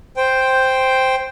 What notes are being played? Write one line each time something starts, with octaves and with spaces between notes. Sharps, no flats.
C5 G5